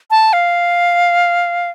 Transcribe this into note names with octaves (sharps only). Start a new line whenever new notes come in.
A5
F5